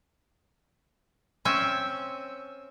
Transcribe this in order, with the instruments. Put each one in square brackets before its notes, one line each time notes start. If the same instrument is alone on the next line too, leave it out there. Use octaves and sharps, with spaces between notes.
[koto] C4 C#4 E5